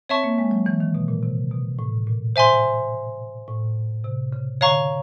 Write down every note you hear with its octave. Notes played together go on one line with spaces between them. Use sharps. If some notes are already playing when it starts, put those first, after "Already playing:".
C4 C#5 E5 A5 C#6
A#3
G#3
F#3
E3
D#3
B2
A#2
C3
B2
A2
A#2
C5 E5 G#5 C6
A2
C3
C#3
D3 C#5 F5 A#5 C#6